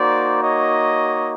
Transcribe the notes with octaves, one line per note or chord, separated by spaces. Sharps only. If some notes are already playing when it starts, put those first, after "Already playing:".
Already playing: A#3 D#4 F#4 C5 D5
C#5 D#5